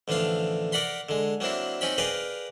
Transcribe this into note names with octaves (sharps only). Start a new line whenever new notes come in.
A1 D3 F3 D4 F5
A#4 D5 F#5 B5 C6
D3 G#3
F#3 A#3 C4 D4 E4
C4 C#4 D#4 G5 B5
G#4 A#4 B4 D5 F5 G5